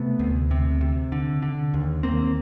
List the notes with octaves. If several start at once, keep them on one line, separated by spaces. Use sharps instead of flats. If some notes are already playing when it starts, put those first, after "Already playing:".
Already playing: C3 A3 B3
D2
C3
C3
D3
D3
D#2
D#2 A#3 C4